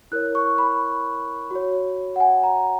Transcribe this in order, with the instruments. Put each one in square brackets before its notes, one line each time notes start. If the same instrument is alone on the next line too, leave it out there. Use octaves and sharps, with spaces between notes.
[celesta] E4 A#4 C#5 F#6
C#6
B5
F#4 C#5
F#5
G#5
A#5